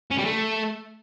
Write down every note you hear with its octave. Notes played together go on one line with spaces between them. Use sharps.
C#4
G3
A3